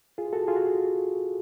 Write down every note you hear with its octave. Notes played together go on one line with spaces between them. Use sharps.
F4 G#4
F#4 A4
F4 G#4
F#4